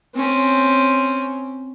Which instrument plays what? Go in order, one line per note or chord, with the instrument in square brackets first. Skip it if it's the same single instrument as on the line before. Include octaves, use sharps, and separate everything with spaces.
[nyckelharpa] C4 C#4